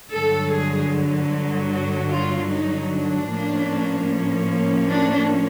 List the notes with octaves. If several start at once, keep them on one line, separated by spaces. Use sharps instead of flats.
G2 D3 F#3 A4
G#4
F#4
F4
D#4
D4
A2 F3 A#3 C#4
D4